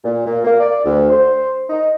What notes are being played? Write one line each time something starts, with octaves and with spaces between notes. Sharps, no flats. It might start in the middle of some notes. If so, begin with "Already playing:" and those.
A#2
A#2
A#3
D5
D2
C5
D#4